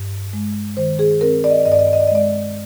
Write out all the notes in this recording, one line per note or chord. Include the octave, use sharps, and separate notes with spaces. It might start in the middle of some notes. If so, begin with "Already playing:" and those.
Already playing: G2
G#3
D#3 C5
G#4
C4 A#4
D5
D#5
D5
G2 D#5
D5
D#5
D5
D#5
D5
D#5
G#3 D5